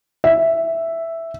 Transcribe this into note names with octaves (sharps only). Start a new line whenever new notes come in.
E5